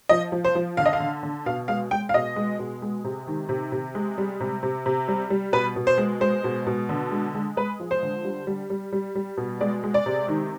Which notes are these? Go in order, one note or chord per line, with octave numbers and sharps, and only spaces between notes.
F3 D#5
F3
C5
F3
D3 F5
D#5
F5
D3
D3
B2 F5
G#3 F5
G#3 G5
F5
B2 D#5
G#3
B2
G#3
C3
D#3
C3
C3
G#3
G3
C3
C3
C3
G3
G3
B2 B4
B2
C5
G#3
G#3 C5
B2
B2
D3
G#3
G#3
G#3 B4
F3
C5
D3
G3
G3
G3
G3
G3
B2
G#3 D5
G#3
D5
C3
D#3